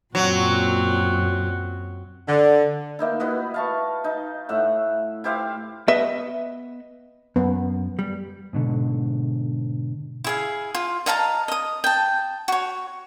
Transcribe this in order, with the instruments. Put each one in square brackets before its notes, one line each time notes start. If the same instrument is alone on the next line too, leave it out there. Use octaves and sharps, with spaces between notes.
[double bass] F#2 [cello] A#2 [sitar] F#3 [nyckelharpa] C4 F#4
[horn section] D3
[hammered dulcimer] A#3 D#4 E4
E4 F#4 B4 D#5
F5 A5 C#6
D#4
A2 E5 F#5
E4 G4 C5 F5
[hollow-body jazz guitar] B3 B4 D#5 [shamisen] E5
[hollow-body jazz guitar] F#2 [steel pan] B3
[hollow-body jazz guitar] G3
[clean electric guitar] G#2 B2 D3
[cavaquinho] E4 G#4 F5
F4
D#5 F5 A5 A#5
D#5 D#6
G5 A5
F#4 C#5